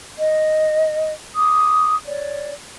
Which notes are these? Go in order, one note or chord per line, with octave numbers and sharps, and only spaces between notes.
D#5
D6 D#6
C#5 D5